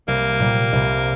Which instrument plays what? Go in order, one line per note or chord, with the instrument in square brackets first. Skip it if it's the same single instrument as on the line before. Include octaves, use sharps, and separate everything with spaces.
[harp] C2 [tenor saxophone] A#3
[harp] A#2 G3
C2